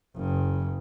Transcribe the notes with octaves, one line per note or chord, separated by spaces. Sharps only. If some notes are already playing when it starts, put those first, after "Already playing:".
F#1 C#3